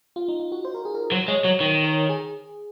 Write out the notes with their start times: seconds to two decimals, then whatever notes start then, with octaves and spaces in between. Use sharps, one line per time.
0.16 F4
0.28 D#4
0.40 F4
0.52 F#4
0.65 C5
0.74 A#4
0.85 G#4
0.95 A#4
1.12 F#3 C5
1.28 G#3 C#5
1.44 F#3 C#5
1.60 D#3 C#5
1.84 A#4
2.09 G#4